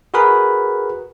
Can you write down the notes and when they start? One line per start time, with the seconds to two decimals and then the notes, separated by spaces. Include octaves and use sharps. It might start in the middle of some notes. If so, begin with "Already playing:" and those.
0.14 F#4 G#4 A#4 B4 B5